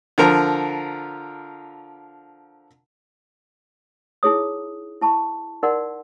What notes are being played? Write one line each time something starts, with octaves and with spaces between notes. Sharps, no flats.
D3 F3 A#4 A#5
D#4 E4 G#4 C#5 D#6
E4 A5 C#6
D#4 A#4 D5 F#5 C6